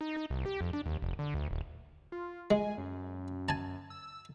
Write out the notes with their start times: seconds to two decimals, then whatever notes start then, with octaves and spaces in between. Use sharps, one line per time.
0.01 D#4
0.17 D#4
0.30 C2
0.46 G4
0.61 F2
0.73 D4
0.86 D#2
1.02 F1
1.19 D3
1.34 D2
1.51 D#1
2.12 F4
2.51 G#3 G#5
2.77 F#2
3.49 G#5 A5
3.90 E6